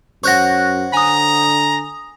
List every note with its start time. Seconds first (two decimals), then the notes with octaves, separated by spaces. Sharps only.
0.24 F#2 C5 C#5 F#5 C#6 F#6 A#6
0.94 D3 G#5 A#5 D#6